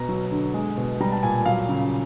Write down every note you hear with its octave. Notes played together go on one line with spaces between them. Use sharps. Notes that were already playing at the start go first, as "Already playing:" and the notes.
Already playing: B2 A#5
F#3
D3
G#3
B2
G3 A#5
A5
A#2 G#5
F#3 F5
C#3